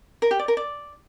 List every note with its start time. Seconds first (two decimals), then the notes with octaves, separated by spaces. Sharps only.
0.22 A#4
0.31 G4
0.39 D5
0.48 A#4
0.57 D5